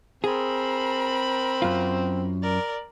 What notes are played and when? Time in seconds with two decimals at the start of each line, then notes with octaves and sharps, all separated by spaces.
0.24 C4 G#4 A#4 B5
1.62 F#2 F4
2.43 A#4 D5